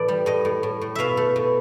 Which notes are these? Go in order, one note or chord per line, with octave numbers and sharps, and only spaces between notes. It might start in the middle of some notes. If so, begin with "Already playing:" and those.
Already playing: A2 E3 D5
G3
A2 D#5
A2
A2
A2
B2 E5 F5
A3
B2